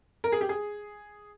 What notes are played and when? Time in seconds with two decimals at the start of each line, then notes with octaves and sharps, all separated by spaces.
0.24 A#4
0.32 G#4
0.41 G4
0.49 G#4